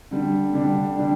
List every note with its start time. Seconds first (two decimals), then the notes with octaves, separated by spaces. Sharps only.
0.11 D3 G3 D4
0.54 D3 G3 D4
0.96 D3 G3 D4